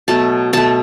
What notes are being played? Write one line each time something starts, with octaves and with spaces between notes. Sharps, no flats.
B2 F#3 A3 A5
B2 A3 A5